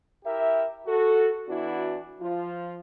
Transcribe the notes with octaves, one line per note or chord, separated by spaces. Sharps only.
E4 G4 A#4 E5
F#4 A4
E3 B3 D4 E4 F#4
F3 F4